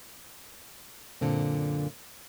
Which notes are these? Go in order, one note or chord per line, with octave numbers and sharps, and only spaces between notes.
F#2 A#2 D3 A#3 C4